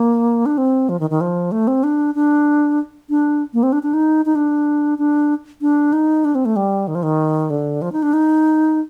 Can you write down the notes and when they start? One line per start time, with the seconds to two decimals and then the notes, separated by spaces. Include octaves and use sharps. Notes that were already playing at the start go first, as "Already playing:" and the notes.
Already playing: A#3
0.46 D4
0.58 C4
0.89 F3
1.00 D#3
1.10 D#3
1.21 F3
1.52 A3
1.68 C4
1.83 D4
2.15 D4
3.10 D4
3.54 A#3
3.63 C4
3.73 D4
3.83 D4
3.94 D#4
4.26 D#4
4.35 D4
4.98 D4
5.61 D4
5.93 D#4
6.25 D4
6.35 C4
6.45 A3
6.56 G3
6.88 D#3
6.95 F3
7.03 D#3
7.50 D3
7.82 F3
7.92 D#4
8.03 D4
8.13 D#4